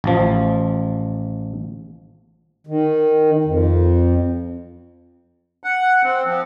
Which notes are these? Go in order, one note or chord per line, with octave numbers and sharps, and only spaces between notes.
A1 F3
D#3
F2
F#5
C4
F3